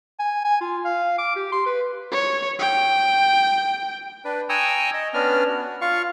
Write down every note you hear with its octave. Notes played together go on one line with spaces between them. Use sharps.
G#5
G#5
F4
F5
D6
G4
C6
B4
C#5
G5
D4 B4
G5 G#5 A#5 C#6 D#6 E6
D#5
B3 C#4 D4 F6
F#4
F4 F5 C#6